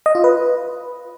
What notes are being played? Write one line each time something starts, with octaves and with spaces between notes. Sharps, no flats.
D#5
F4
B4